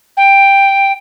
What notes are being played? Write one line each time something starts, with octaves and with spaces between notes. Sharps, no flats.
G5